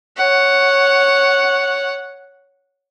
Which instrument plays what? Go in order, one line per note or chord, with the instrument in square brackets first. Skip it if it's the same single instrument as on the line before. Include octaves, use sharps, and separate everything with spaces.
[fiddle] C#5 F#5